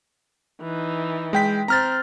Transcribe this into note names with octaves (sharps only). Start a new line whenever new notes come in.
E3 D#4
G#3 G5 B6
C4 C5 A#5 F6 A6